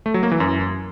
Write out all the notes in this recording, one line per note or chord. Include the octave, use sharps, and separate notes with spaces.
A3
F#3
A#3
E3
F#2